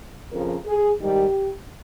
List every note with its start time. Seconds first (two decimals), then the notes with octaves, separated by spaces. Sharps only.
0.31 F2 C#3 F3 A#4
0.66 G#4
1.00 G#2 D#3 G3 G4